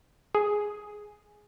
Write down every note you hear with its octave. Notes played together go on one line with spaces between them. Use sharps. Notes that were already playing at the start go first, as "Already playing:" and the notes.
G#4